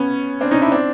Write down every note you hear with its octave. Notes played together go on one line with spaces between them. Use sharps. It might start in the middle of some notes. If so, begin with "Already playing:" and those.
Already playing: B3 C#4
C4 D4
C#4 D#4
D4 E4
C4 D4